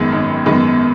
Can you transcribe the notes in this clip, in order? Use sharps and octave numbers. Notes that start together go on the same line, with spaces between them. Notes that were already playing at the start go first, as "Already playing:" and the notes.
Already playing: G#1 F#2 D#3 G#3 B3
G#1
F#2 D#3 G#3 B3